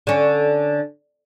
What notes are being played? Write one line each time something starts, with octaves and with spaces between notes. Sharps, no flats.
D3 C#4